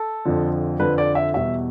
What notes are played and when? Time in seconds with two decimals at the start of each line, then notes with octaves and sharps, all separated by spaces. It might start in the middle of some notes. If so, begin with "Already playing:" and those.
Already playing: A4
0.25 F2 D3 F3
0.79 F2 D3 F3 B4
0.98 D5
1.15 E5
1.33 E2 B2 G3 E5